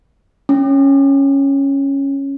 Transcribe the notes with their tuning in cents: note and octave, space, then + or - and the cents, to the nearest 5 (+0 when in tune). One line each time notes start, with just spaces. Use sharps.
C#4 -5